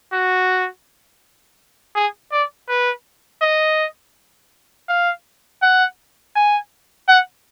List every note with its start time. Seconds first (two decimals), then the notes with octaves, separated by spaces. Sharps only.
0.12 F#4
1.95 G#4
2.32 D5
2.69 B4
3.42 D#5
4.88 F5
5.62 F#5
6.35 G#5
7.08 F#5